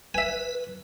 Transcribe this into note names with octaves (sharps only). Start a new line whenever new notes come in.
B4 E5 G#5